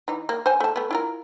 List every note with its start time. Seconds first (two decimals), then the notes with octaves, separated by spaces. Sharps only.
0.08 E3 D#4
0.29 A#3
0.46 C5 G#5
0.60 A3 A5
0.76 A3 B3
0.91 E4 F4 A#4